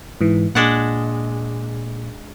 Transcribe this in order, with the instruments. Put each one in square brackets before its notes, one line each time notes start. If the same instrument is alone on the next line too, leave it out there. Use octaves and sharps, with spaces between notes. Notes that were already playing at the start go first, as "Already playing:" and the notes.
[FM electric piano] G#2 E3
[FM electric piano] A#2 [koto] G#3 D4 F#5